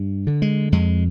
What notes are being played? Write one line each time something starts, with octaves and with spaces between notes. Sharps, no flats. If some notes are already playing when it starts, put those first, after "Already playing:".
Already playing: G2
D3
G#3
F2 G#3